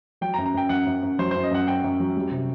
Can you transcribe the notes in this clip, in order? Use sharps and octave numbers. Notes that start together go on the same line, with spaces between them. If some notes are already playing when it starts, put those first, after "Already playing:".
F#3 G5
A#5
F#2
A#5
F#2 G5
F#2 F#5
F#2
F#2
F#3 C5
F#2 C5
D#5
F#2 F#5
F#2 G5
F#2
F#3
G3
C3